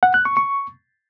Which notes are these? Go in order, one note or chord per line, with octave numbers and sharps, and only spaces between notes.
F#5
F#6
C#6
C#6